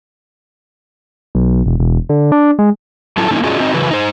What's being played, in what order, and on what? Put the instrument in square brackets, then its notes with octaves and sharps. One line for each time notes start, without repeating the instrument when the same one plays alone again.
[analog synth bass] B1
E1
E1
D3
D4
G#3
[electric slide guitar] F#3 C#4 E4 F4 A4 A5
D3 A#3 C#4 D#4 E4
C#4 D4 F4 F#4 G#4 D#5
C4 D#4 F#4 D#5
C#3 E3 F#3 B4
D#4 C5